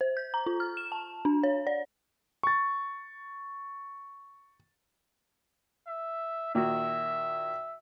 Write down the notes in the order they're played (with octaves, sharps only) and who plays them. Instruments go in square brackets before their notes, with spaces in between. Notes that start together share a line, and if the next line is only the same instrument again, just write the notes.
[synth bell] C5
G6
A#5
F4
F6
E7
A5
D4
C#5
D5
[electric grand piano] C#6 A6
[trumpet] E5
[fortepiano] A#2 D#3 F#4 [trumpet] E5